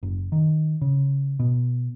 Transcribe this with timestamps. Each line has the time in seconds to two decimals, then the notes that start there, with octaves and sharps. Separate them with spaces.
0.03 F#1
0.32 D#3
0.82 C#3
1.40 B2